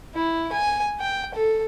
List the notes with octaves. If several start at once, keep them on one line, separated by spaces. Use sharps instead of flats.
E4
G#5
G5
A4